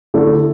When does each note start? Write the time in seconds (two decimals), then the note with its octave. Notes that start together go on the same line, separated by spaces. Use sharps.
0.14 D3 A3 E4